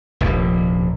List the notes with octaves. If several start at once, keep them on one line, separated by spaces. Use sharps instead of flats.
F1 A#1 D#2